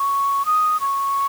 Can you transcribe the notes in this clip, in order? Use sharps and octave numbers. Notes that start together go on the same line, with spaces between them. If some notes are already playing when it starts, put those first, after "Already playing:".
Already playing: C#6
D#6
C#6